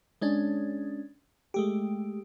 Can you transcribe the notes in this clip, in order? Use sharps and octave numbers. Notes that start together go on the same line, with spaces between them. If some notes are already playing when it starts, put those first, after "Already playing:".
G#3 C#4 D4
G#3 A3 G4